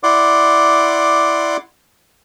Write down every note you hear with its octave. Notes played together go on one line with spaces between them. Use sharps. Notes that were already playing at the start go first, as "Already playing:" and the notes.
E4 D5 F#5 C6 D6